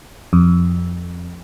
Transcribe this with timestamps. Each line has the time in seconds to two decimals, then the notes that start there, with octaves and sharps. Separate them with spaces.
0.33 F2